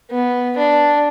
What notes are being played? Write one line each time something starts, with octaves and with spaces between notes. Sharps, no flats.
B3
D4